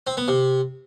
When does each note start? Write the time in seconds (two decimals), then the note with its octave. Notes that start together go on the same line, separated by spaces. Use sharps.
0.07 C4
0.17 B3
0.28 C3